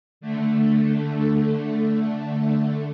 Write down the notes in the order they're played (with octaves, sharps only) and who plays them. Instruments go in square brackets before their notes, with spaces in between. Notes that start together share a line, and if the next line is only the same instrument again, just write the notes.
[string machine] D3 A3